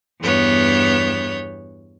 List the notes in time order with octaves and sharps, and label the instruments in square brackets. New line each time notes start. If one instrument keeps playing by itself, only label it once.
[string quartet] E2 G2 B3 C#5 G6